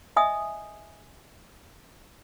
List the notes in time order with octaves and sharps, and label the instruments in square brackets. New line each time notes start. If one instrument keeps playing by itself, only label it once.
[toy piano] D#5 E5 G#5 D#6